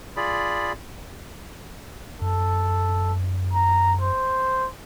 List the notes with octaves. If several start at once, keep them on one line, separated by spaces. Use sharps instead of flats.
F4 G#4 D5 B5
F#2 A4
A#5
C5